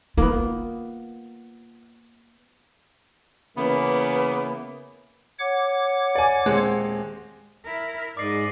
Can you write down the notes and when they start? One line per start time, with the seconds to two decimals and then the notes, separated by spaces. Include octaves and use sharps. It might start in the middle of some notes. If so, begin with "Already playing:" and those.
0.17 A#3 B3 F4
3.56 C#3 E3 A#3 B3
5.39 C#5 F#5 D6
6.15 D5 G#5
6.45 D#1 G#3 C4
7.65 E4 A#4
8.17 G#2 D5 D#5 D6 C7